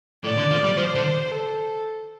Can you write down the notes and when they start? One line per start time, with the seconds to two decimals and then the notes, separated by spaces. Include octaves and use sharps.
0.24 A2 D5
0.38 D3
0.51 F3
0.64 G3
0.77 F3 C5
0.95 D3
1.31 A4